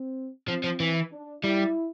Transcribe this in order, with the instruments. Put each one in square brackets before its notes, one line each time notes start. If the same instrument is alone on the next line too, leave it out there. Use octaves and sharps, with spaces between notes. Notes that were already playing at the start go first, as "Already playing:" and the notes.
Already playing: [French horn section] C4
[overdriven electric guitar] F3 [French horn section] C4
[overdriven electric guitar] F3
E3
[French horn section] D4
[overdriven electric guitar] G3 [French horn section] E4